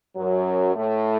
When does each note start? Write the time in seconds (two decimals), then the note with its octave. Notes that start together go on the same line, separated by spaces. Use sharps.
0.16 F#2 F#3
0.75 A2 A3